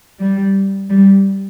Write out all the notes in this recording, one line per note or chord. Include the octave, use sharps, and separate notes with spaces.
G3
G3